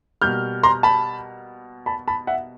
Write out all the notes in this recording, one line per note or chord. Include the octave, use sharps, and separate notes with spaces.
B2 G3 A#3 F6 G6
A#5 C6
A5 B5
A5 B5
A5 B5
E5 F#5